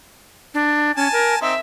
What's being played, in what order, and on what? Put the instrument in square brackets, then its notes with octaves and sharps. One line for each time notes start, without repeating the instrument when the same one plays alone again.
[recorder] D4
[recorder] C#4 [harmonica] G#5 A5
[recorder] A#4
[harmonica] C4 D#4 [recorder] E5